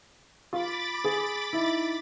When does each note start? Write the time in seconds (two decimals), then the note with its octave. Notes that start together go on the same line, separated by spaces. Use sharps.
0.53 F4 B5 D6 A6
1.04 G#4
1.53 D#4 E4